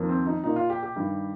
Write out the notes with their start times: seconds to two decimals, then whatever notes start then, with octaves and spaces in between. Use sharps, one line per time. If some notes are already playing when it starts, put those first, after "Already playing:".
Already playing: F2 D#3 A#3
0.09 C4
0.26 D#4
0.44 A#2 A#3 D#4
0.56 F4
0.70 G4
0.83 G4
0.96 G2 D#3 G3